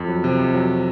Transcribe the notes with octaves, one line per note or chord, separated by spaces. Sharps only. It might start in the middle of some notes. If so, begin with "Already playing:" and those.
Already playing: F2
F#3
C3
F2
F#3